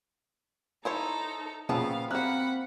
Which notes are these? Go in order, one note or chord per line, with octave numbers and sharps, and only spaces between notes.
D#4 E4 A4 C5 C#5 A#5
A#2 C#3 F3 B3 C4 F5
A#3 C4 F#4 F#5 B5 F6 F#6